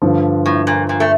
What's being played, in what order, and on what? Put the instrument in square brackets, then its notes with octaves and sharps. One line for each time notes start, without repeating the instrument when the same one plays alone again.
[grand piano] G2 D3 F3
[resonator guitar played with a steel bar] A2
A#2
A#2
A3